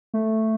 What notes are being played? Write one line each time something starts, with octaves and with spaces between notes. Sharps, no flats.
A3